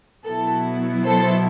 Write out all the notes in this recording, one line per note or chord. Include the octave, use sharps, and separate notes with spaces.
B2 F#3 B3 E4 A4
A4 C5